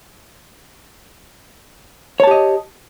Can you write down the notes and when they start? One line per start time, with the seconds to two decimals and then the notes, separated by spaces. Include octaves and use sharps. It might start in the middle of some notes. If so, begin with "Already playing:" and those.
2.20 C#5
2.23 A5
2.27 G4
2.31 D#5